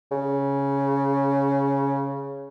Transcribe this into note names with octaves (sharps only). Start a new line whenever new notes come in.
C#3